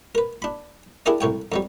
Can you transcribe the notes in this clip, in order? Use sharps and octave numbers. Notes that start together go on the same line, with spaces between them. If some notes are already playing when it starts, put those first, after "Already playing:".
A#4 B4
D4 B5
D4 E4 G4 G#4 A#4 D5
C2 A2 C#5 G5
F2 F#3 G3